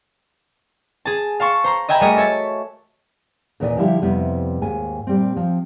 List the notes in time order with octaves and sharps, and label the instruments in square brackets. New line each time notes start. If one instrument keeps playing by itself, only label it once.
[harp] G#4 A5
F5 A5 C6 C#6
C5 A#5 C6
D#5 E5 G5 G#5 A#5 B5
G3 A3 F#4 G#4 A#4 D#5
A4 C#5 E5 A5
[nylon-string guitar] D#2 A#2 E3 A#4 D5 G#5
D3 F3 G3 E4 G4
F2 C3 G3 B3 E4
D#2 G#2 G#5
A#2 G3 C4
F3 C4